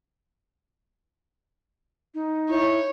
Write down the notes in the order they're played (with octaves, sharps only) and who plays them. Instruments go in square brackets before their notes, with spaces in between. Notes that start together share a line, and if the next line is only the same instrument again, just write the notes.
[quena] D#4
[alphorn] E4 [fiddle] C#5